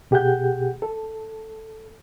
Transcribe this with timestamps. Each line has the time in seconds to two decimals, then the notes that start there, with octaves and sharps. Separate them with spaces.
0.11 B2 G4 G#4 F#5 G6
0.82 A4